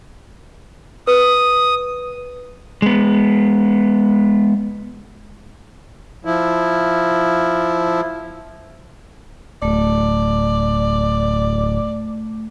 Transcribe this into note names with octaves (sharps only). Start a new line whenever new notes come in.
B4 D#6
G#3 B3
F3 E4
D1 A3 D5